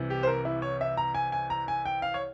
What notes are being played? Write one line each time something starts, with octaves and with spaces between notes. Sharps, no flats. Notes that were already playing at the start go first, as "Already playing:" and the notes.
Already playing: C2 C3 E3
G4
C5
A#4
E4
C#5
E5
A#5
G#5
G#5
A#5
G#5
G5
F5
C#5